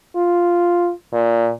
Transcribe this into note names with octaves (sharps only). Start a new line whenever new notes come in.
F4
A#2